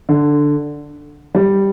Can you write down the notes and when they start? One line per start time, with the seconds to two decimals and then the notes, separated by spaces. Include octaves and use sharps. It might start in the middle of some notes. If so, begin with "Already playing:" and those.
0.09 D3
1.35 G3